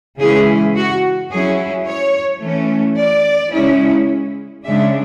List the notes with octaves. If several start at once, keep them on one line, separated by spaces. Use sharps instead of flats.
C#3 E3 G#3 C#4 E4 G#4
F#4
F#3 C#4 E4 G#4
C#5
E3 A3 C#4
D5
C#3 G#3 C#4 E4
C#3 G#3 D4 E5